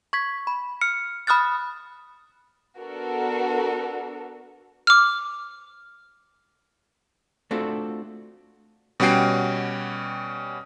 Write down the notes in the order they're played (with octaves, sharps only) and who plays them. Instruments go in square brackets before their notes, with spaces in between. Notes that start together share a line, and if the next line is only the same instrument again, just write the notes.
[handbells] C#6 G#6 B6
B5
F6 C#7
B5 D#6 F6 F#6 A6
[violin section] B3 D4 F#4 A4 A#4
[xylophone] D6 F6
[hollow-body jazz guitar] A3 C4 D4 F4 F#4 A4
[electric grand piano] B2 G3 C#4 F#4 G5 C7